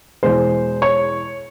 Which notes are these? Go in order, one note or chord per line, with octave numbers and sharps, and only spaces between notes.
E2 B2 G#3 C5
C#5